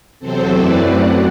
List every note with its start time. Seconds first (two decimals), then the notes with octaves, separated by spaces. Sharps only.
0.19 E2 C3 F#3 C4 A4 C5
0.49 F#2 E3 A3 C4 B4 D5
0.79 F#2 F#3 A3 C4 D5 F#5